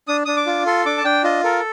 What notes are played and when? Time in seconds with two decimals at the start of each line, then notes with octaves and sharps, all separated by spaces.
0.08 D4 D#6
0.26 D4 D#6
0.37 D6
0.46 F4
0.66 A4 C6
0.86 D4 D6
0.98 A5
1.04 D4 G5
1.24 F4 D#5
1.44 A4 A#4